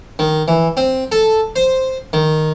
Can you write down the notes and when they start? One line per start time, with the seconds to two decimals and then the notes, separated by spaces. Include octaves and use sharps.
0.19 D#3
0.48 E3
0.77 C4
1.12 A4
1.56 C5
2.13 D#3